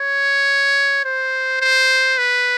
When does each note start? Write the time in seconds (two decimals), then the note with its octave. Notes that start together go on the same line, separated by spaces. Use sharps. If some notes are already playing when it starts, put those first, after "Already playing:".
Already playing: C#5
1.05 C5
1.61 C5
2.18 B4